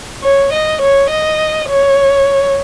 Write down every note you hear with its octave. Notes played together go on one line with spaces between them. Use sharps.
C#5
D#5
C#5
D#5
C#5